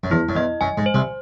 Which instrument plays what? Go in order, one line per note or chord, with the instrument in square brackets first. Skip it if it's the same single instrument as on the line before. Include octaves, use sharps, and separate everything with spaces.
[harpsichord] F#2
[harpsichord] E2 [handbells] E4
[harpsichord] F#2
[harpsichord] E2 [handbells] D#5
[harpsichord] F#2 [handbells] G#5
[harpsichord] G#2
[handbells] C5
[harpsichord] C2 C3